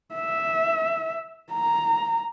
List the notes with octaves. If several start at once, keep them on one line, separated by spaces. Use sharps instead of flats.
E5
A#5